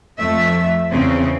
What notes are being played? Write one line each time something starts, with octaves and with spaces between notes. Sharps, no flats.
F2 A3 E5
E2 C#3 C4